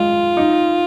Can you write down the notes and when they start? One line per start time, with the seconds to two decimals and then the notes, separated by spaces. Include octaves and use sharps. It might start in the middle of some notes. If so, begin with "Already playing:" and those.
Already playing: G#3 F4
0.37 D#4